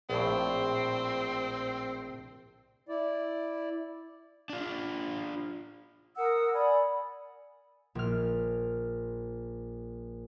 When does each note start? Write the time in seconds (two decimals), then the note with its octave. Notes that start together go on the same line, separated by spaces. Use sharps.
0.10 A#1 A2 C4
2.89 E4 D5
4.50 D4 F4
6.16 A#4 F#5 D#6 E6
6.53 D5 G#5 B5
7.95 A#1 F6